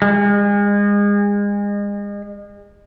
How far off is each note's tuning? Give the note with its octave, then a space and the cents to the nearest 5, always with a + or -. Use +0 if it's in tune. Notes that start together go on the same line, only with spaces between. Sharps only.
G#3 -35